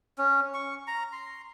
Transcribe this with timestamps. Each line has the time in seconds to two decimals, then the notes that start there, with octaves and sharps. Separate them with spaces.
0.18 C#4
0.54 C#6
0.87 A#5
1.13 C6